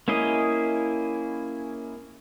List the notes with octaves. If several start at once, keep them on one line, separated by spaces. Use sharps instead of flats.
A#3 C#4 E4 G#4 D#5